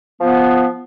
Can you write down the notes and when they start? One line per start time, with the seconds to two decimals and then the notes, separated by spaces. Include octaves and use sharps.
0.21 F3 B3